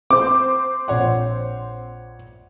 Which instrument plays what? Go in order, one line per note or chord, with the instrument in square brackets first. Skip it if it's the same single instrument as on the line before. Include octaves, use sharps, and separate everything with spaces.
[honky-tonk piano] C4 C5 [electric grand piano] D6
[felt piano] A#1 C#5 F#5